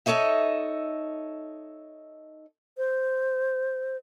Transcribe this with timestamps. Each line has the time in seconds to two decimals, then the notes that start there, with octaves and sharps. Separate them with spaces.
0.06 D#4 A4 C#5 D#5 E5
2.78 C5